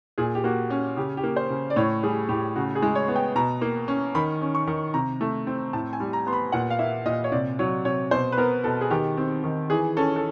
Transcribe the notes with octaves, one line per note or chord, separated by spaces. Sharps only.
A#2 G#4
G4
A#3 F#4
C#4
C#3 G4
G4
A#3
C5
C#3
D5
A2 C#5
G3 G#4
A2 G4
C#3 F#4
G#4
G#3
C#5
B3
G5
B2 A#5
A#3
C#4
D#3 B5
C#4
C#6
D#3
C3 A#5
A3
C4
A2 A5
G#5
G3
A#5
B3 C6
B5
A#2 F#5
F5
A#3 E5
A#2 D#5
C#5
C3 D5
F#3 C#5
C3 C#5
B2 C5
B4
B3 A#4
B2 A4
G#4
D#3 G4
C4
D#3
E3 G#4
C#4 A4
A4